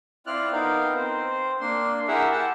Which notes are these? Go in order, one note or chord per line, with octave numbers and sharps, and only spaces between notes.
C4 E4 F4 D5 F6 F#6
B3 D#4 A#4 F5 G5
C4 C5
A#3 D4 C6
E4 G4 G#4 A#4 E5 F#5
F#5 G5 A5